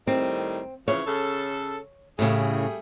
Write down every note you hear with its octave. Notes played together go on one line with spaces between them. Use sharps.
A2 D#3 G3 C4
C#3 E3 F3 C#5
C#3 A4
A2 C#3 G3 A3 G#4